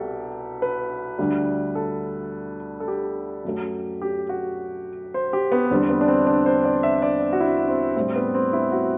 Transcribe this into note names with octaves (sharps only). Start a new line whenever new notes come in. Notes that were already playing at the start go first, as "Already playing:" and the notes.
Already playing: C2 B2 G4 A4
B4
D2 D3 G3
A4
A4
G4
F#2 F#3 A3
G4
F#4
C5
G4
B3
E2 D3 G3 C4
B3
D4
C4
D4
C5
D5
E5
D5
F#4
E4
C4
A2 G3 C4
B3
C4
E4
F#4